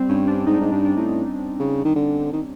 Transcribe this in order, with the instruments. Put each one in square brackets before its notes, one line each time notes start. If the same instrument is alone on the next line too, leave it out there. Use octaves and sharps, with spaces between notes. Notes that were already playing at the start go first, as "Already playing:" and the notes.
Already playing: [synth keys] G3 C4
[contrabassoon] G2 [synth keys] C#4
[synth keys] D4
[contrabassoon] G#2 [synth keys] D#4
[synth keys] D4
[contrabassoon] G#2 [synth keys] D#4
[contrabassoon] G2 [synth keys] D4
[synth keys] D4
[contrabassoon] A2 [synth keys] D#4
[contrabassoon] C#3
D#3
D3
D#3